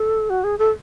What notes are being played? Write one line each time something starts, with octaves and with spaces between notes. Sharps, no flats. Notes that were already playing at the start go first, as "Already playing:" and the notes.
Already playing: A4
F#4
G#4
A4